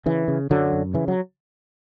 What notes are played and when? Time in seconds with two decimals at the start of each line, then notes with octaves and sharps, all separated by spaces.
0.06 C#3 E3
0.28 C#3
0.50 F#2 D3 F#3
0.73 F#2
0.94 C#3 E3
1.08 F#3